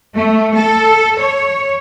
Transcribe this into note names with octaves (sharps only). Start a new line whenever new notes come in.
A3
A4
C#5